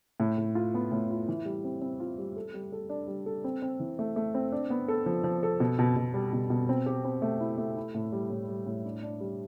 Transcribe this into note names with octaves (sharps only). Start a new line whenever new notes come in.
A2
A2
F4
B3
A2
F4
E3
G3
C4
C4
F4
G3
A4
G3
A4
D4
G3
A4
C4
C4
E3
A3
A3
C4
D4
B3
A4
F3
F3
A4
B2
B2
B2
G3
B2
B2
C4
G4
C4
A3
E4
A3
E4
A2
G3
A2
G3
A2
D4
D4
G3